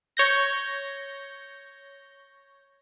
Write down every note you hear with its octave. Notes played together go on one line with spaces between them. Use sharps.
C#5 G6 A#6